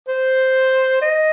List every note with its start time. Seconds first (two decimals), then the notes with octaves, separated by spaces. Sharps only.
0.08 C5
1.02 D#5